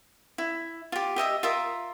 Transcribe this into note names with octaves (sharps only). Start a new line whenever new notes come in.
E4
F4 G4
G4 D#5 E5 D#6
F4 A#4 E5 D#6